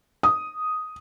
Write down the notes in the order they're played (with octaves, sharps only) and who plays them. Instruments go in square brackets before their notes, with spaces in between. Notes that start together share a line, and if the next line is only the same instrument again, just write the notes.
[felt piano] D#6